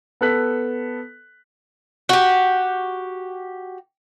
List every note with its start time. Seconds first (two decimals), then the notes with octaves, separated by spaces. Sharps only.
0.21 B3 A4 F#6 B6
2.09 F#4 G4